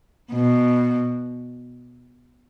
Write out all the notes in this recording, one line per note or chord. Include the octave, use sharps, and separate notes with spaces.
B2